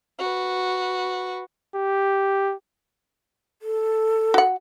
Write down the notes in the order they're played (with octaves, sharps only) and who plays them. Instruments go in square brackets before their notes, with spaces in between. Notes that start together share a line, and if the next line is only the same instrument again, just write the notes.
[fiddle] F#4 B4
[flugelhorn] G4
[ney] A4
[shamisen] F#4 F#5